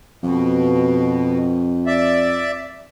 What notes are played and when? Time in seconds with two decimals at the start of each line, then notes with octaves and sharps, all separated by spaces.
0.23 F2 B2
1.87 D5 E5